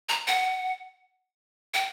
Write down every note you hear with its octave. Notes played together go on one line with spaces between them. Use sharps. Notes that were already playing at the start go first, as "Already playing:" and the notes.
A#5
F#5
G5